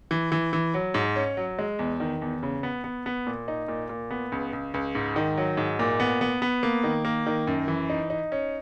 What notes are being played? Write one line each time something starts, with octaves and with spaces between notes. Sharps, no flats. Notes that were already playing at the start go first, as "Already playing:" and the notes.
E3
E3
E3
F#3
G#2
C#4
F#3
G#3
E2
D#3
E2
C#3
B3
B3
B3
A#2
D#4
A#2
A#2
B3
C#2
C#2
C#2
G#2
D#3
F#3
G#2
A#2
B3
B3
B3
A#3
D#3
A#3
D#3
F#2
E3
D#4
D#4
C#4